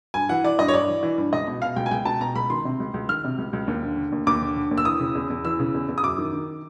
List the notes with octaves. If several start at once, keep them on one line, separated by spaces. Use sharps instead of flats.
G2 G#5
E3 F#5
E3 D5
G2 D#5
C#5
G2 D5
E3
E3
G2
C#2 D#5
B2
B2 F5
C#2 G5
G#5
C#2 G5
B2 A5
B2 A#5
C#2 B5
D#3 C6
C3
C#2
C#2
D#3 F6
C3
C#2
C#2
D#2
D3
D3
D#2
D#2 D6
D3
D3
D#2
E6
E3 D#6
C#3
E2
E2
E3 E6
C#3
E2
E2
D#6
F#2 D6
D#3
D#3